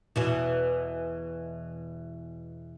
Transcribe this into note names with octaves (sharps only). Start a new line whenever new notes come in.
E2 B2 E3